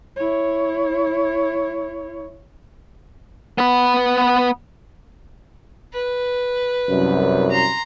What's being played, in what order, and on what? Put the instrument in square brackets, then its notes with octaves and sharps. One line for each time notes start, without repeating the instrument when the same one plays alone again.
[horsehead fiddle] E4 C#5
[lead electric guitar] B3 B4
[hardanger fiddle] B4
[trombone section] C2 F#2
[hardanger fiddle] A#5 C6